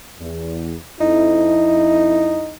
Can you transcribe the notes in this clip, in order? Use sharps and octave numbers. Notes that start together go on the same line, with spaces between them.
E2
F2 D#4 E4